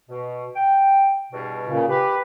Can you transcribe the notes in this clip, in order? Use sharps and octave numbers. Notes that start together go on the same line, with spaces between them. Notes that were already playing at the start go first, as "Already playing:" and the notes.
B2
G5
E2 G2 B2
A#2 C#3
G4 B4